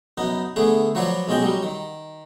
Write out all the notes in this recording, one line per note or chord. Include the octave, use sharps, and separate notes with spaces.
F#2 B3 D#4
D3 A3 B3 G#4
F3 F#3 F#4 B4 C#5 D5
B1 G#3 C#4 D#5 G5
F#3 G3
D#3